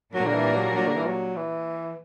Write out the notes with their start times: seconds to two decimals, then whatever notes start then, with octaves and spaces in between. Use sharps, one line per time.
0.14 A#2 F#3 G3 A#3 D4 A#4
0.27 D3
0.35 E3
0.54 F#3
0.75 F#3
0.88 D3
0.97 E3
1.06 F#3
1.36 E3